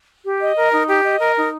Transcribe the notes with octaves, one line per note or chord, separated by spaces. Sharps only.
G4
D#5
A#4
D#4
G4
D#5
A#4
D#4